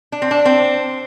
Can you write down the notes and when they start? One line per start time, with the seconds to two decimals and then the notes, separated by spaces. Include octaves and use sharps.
0.12 D4
0.22 C4
0.31 D4
0.45 C4